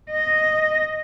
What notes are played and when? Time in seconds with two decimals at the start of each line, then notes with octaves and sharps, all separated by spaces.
0.11 D#5